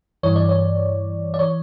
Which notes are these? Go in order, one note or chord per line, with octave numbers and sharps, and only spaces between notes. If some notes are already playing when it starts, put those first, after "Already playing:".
G2 E3 C#5
D5
C#5
D5
E3 C#5